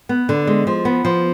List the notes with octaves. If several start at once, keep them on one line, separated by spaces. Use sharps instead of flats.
B3
D3
G#3
F3
B3
F3